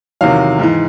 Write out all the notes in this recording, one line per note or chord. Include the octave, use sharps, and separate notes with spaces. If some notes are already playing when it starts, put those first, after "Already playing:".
E2 C3 D#3 F#3 F5
G#2 E3